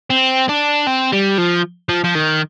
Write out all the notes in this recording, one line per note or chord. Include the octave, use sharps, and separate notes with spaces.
C4
D4
C4
G3
F3
F3
F3
D#3